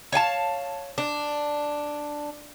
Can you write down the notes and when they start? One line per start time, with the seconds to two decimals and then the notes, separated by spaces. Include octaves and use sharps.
0.12 C#5 F5 G#5 A5
0.98 D4